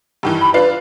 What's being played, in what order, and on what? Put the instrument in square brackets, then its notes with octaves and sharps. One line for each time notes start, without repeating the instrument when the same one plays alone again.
[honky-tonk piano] G2 D#3 E3
[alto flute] B5
[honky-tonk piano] D4 F4 C7 [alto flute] B4